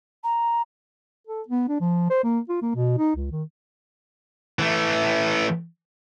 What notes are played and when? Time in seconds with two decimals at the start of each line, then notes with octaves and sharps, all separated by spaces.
0.24 A#5
1.27 A4
1.49 B3
1.69 D4
1.81 F3
2.10 C5
2.24 A#3
2.49 F4
2.62 A#3
2.76 B2
2.98 D#4
3.16 C#2
3.32 D#3
4.59 E3 A3